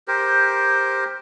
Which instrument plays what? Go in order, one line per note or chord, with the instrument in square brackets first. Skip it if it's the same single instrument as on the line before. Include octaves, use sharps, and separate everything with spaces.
[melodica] G4 A#4 C5